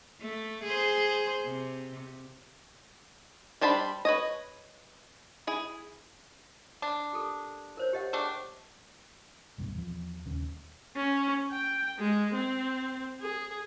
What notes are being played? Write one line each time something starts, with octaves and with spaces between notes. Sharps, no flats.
A3
G#4 C5
C3
G3 D4 C5 A5 B5
B4 C#5 D#5
E4 G#4
D4
G4 A4 A#4
A#4 C5 C#5
G4 D#5 F#5
A3 D4 G#4 G5
C2 G2 B2
E2 F3
D#1 D#2 C#3 C#4
C#4
G5
G#3
C4
G#4